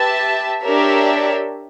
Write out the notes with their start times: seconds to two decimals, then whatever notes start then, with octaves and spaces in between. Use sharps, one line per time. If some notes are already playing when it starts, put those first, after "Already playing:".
Already playing: G4 B4 E5 A5
0.63 D4 G4 A#4 C#5 E5